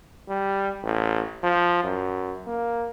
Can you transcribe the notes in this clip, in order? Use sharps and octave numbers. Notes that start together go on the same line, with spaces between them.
G3
A1
F3
F#2
A#3